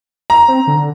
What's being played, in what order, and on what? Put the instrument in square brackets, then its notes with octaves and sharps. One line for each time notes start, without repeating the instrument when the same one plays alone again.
[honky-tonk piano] A#5
[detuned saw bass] C4
D3